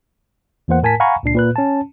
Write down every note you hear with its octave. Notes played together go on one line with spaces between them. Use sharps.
E2 E3 A#3 C5 F#5
A2 A#4 G#5 A5 B6
F5 F#5 G#5 A#5 B5 C#6
C#2 A#2 D4 C7
A#2 B4 F#6
C#4 A5